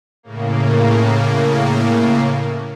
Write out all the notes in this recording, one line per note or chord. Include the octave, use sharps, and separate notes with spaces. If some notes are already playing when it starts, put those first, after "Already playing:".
A2 C#3 A#3